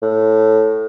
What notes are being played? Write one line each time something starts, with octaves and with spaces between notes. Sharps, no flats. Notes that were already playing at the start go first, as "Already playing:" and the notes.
A2